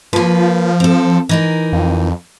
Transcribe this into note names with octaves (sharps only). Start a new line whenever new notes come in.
F3 A#3 B4
C4 A4
E3 D#4 A#4
F2